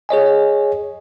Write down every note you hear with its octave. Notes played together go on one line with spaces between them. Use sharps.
G#4 C#5 D#5 G#5